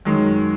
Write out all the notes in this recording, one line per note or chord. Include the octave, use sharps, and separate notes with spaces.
F#2 D#3 G#3